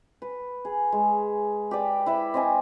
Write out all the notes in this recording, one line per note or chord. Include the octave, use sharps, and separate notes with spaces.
B4
G#4
G#3
G4 B4 D5
E4 B4 E5
C4 D#5 G#5